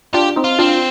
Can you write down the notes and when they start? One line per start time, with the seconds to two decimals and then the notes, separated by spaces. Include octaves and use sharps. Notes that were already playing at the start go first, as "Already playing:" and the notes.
0.14 D4 F4 G4
0.36 C4 D#4
0.44 F4
0.59 C4 D4 F4